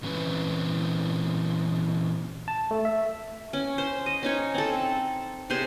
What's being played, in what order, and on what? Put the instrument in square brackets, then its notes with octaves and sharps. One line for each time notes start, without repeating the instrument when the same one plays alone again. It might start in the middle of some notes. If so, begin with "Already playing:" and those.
[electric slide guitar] A#2 E3 C4 C#4 B4
[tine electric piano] A5
A3
E5
[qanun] C#4
C5
D#5
C#4 D#4 C#5
C4 A4
C3 G#4 C5 C#5